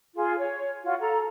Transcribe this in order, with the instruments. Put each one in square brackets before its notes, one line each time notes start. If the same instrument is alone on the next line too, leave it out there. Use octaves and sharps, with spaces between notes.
[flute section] F4 G#4
C#5
F4 F#4
A4 A#5